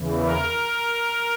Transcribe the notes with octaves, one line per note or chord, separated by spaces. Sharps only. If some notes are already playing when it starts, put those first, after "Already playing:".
Already playing: E2 C#3 E3
A#4